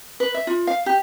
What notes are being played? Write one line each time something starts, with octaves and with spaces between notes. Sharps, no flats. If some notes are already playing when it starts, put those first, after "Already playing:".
B4
E5
F4
F5
G4